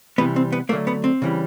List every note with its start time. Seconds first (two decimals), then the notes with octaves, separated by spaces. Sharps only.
0.18 C3 E3 G3 B3
0.36 C4
0.52 B3
0.69 D3 F#3 A3 A#3
0.87 B3
1.04 C4
1.22 C#3 E3 G3